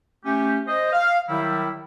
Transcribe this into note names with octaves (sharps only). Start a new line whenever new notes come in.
A3 C#4 G4
C5 D#5
F5
D#3 F#3 G3 E4